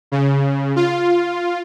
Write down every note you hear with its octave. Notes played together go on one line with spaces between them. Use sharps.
C#3
F4